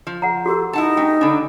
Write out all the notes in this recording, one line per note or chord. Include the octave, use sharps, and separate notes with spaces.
F3
F#5 A#5
F#4 G4 A4 A#4
D#4 E4 F#5 A5
A3 D4 G5
D3 D4 G#5 B5